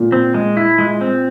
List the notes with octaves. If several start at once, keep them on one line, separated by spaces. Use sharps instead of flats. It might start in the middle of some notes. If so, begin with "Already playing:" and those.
Already playing: A#2
C4
G#3
E4
G#3
C4